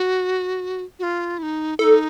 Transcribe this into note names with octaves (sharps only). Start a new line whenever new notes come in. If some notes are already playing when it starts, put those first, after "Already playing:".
Already playing: F#4
F#4
F4
E4
D#4
D#4 E4 A4